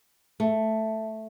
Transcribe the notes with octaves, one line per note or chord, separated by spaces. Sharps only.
A3